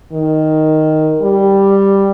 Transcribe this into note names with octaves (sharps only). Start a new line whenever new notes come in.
D#3
G3